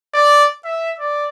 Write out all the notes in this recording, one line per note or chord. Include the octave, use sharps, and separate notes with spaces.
D5
E5
D5